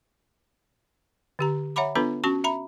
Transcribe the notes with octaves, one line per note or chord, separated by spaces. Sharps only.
D3 G4 A#5
C#5 E5 F#5 A#5 B5 D6
B3 D4 F4 A4 B4 B5
C#4 F#4 A5 C#6
E5 A#5 B5